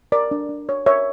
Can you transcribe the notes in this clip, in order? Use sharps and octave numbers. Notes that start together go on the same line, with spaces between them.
A#4 D5
D4
D4
C#5
A#4 C#5 E5